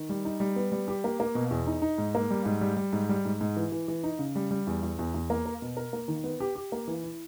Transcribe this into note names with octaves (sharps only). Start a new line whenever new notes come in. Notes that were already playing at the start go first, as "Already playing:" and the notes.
Already playing: D#3
G3
D#4
G3
B3
G3
G4
A#3
A#3
B2
E2
D#4
D#4
G#2
A#3
G3
G#2
G3
G3
G#2
G3
G#2
G#2
E3
E3
E3
D#4
C#3
G3
G3
E2
E2
E2
E2
A#3
A#4
B2
A#4
A#3
D#3
B3
G4
G4
A#3
E3
E4